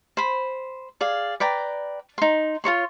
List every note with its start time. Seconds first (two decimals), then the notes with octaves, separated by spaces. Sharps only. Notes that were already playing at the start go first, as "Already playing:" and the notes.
0.17 C5 B5
1.01 G#4 D5 F5
1.40 B4 D5 G5 A#5
2.18 D#4 C6
2.64 F4 A#4 C#5 C6